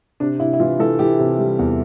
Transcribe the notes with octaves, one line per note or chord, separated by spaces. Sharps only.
C3 D4
C3 E4
E4
E3 F4
E3 A4
E3 G4
C3
G3
E2